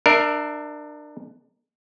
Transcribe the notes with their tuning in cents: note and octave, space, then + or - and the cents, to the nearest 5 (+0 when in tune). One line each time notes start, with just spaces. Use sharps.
D4 +25 A#4 +0 E5 +0